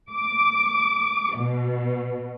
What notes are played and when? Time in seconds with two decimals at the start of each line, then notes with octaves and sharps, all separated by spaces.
0.12 D6
1.38 B2